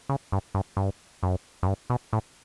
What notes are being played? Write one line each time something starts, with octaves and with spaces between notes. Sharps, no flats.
C#3
G2
G2
G2
F#2
F#2
G2
B2
A2